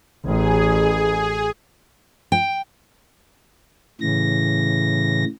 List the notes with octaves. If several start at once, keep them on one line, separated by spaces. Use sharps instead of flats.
A1 G#4
G5
A2 C#3 E3 A#6